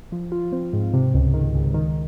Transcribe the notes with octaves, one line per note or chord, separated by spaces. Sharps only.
F3
F4
C4
G#2
C3
C#2
D#3
C#2
D#3